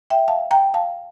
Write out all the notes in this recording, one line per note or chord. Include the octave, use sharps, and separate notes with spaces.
E5 G5
F5 A5
G5 A#5
F5 A5